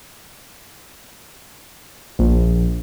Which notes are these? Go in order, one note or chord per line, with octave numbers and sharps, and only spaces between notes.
A#1